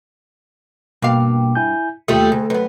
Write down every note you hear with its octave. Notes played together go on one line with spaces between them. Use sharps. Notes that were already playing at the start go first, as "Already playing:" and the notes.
G2 B2 A#3 F5 D6
E4 G#5 G6
D#2 G3 A3 F4 D#6
D2 G#4
F#2 B3 B4